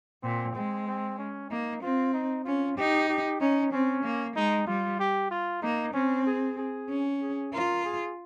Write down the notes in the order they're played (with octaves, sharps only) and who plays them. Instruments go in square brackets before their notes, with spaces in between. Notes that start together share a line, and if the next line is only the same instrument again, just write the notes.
[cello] A#2 [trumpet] C4
[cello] G#3 [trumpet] C4
[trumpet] C4
C#4
[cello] A#3 [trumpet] D#4
[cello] C4 [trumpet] F4
[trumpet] D#4
[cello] C#4 [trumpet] F4
[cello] D#4 [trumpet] G4
[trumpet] G4
[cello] C#4 [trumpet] D#4
[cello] C4 [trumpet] C#4
[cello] A#3
[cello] G#3 [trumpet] D#4
[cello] G3 [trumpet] F4
[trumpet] G4
F4
[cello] A#3 [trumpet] D#4
[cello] C4 [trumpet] C#4
[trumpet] G#4
G#4
[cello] C#4
[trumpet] G#4
[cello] F4 [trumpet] A#4
[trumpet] G#4